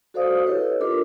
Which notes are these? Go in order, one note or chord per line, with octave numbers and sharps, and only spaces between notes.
F#4 A4 C5 D5 F5 D#6
E4 G4 A4 B4 C#5 D#5
D4 F4 A4 A#4 D#5 D6